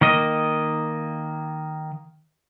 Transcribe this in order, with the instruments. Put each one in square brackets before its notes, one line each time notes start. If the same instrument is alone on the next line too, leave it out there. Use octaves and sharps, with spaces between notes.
[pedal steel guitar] D#3 A#3 D#5